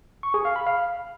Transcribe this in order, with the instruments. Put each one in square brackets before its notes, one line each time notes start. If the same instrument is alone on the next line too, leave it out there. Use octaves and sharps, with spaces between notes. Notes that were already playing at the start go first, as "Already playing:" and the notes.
[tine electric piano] C#6
G#4
F5
B5
F5